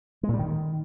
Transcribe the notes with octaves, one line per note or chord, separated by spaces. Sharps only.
G#3
A#2
G3
D#3